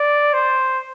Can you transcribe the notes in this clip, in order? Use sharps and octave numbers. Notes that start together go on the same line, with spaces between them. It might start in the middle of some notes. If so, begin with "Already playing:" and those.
Already playing: D5
C5